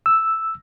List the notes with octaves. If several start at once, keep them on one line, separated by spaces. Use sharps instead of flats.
E6